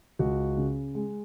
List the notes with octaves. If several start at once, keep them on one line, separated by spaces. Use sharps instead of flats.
C#2 F#4
C#3
G#3